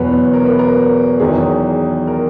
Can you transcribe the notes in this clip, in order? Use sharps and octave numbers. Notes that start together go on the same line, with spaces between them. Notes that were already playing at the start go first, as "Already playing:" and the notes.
Already playing: E2 B2 F#3 B4 C#5
A#4
B4
A#4
E2 D#3 F#3 G#4
A#4